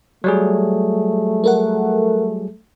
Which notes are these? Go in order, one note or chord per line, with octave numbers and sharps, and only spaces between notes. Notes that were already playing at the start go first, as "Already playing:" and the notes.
F#3 G3 A3 G#4
A4 A#4 F#5